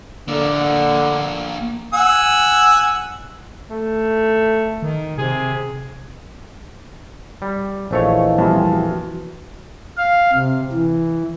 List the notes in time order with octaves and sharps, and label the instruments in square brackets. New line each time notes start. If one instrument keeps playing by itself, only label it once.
[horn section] D3 [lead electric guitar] A#3 D4
[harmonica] F#5 G#5 E6
[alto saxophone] A3
[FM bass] D#3
[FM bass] C3 [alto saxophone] G#4
[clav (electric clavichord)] G3
[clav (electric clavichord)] A#1 A3 C#5 [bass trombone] E3 [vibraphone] C5 D#5 F5
[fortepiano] F2 C3 F3 [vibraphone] G3 G5 G#5
[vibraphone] F#4
[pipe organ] F5
C3
E3